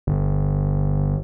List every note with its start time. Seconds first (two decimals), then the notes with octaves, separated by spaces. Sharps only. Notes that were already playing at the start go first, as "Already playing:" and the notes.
0.07 G1